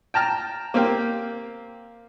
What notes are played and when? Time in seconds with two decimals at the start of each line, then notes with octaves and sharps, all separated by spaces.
0.14 G5 A5 A#5 F6
0.74 A#3 C4 G4 F5 G5